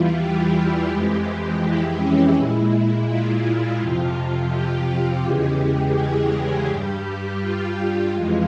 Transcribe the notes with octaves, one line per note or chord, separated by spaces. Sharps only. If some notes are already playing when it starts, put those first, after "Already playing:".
Already playing: E2 E3 G3 E4 F4
G4
F2 E3 G#3
E4
C#4
A#2 G#3 E4
F4
F2 C3 F3
G4
E2 C#3 E3 G#3
G#4
G2 G3 G4
F4
G4
F2 E3 G#3 F4